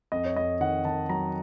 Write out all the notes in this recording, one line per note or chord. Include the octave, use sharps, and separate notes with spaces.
F2 D#5
C#5
F2 D#5
D#3 F#5
D#3 A5
F#3 A#5